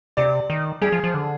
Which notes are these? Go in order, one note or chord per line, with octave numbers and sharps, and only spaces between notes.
C3 D5
D#3
G3 G#4
F3
F3
D3